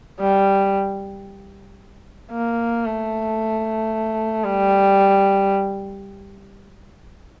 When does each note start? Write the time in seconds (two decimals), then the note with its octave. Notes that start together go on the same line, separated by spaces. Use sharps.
0.20 G3
2.32 A#3
2.85 A3
4.44 G3